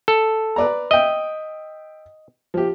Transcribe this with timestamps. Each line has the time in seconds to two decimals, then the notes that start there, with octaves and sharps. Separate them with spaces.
0.08 A4
0.56 B4 D5 A#5
0.91 D#5 E5 G5
2.54 F3 G4